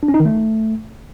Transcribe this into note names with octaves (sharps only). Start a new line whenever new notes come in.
D4
C#4
D#4
D#3
A3